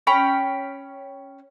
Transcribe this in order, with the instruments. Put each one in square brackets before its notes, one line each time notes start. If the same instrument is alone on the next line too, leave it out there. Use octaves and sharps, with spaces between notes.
[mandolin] C#4 G5 B5